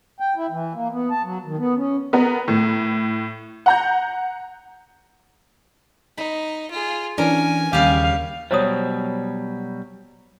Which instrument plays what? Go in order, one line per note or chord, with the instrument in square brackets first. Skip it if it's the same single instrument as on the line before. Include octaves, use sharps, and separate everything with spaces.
[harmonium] G5
E4
E3
A#3
B3
A5
F#3
D#3
B3
C#4
[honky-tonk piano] B3 A#4
A2
F#5 A#5 G6
[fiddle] D#4 [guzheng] B5
[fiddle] F4 G#4
[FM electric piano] E3 D4 [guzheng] C#4 A#4 [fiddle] G#5
[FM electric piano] D#2 [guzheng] C#3 G3 G4 [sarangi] F5
[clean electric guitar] B2 F#3 G3 [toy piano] C5 C#5 D#6